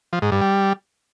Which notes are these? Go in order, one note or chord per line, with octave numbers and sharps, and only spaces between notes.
F3
G#2
G2
G3